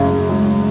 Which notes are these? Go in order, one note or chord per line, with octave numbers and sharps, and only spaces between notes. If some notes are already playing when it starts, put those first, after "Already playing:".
Already playing: F#2 C#3
G#3